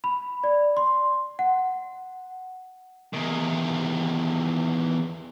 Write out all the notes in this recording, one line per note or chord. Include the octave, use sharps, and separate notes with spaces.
B5
D5
C6
F#5
E2 D#3